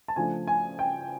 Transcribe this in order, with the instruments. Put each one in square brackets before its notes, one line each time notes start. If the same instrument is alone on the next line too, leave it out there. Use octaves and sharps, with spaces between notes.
[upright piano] A5
C#3 F3 A3 D4 G#5
G#5
G5